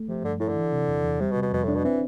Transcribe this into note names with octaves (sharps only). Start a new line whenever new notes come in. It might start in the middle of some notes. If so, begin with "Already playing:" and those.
Already playing: A3
C3 F3
G2 D3
A2 E4
D3
E3
C3
E2
E2
C3 G3
B2
C3
B2
F2 B2
A2 D4
B2
E3 C4